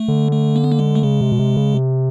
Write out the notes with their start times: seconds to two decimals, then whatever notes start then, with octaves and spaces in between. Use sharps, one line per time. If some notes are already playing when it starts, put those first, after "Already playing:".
Already playing: A3
0.08 D3
0.32 A3
0.56 A#3
0.64 B3
0.72 A#3
0.79 G#3
0.95 A3
1.03 C#3 G#3
1.21 C3
1.32 B2
1.39 C3
1.57 C#3
1.74 C3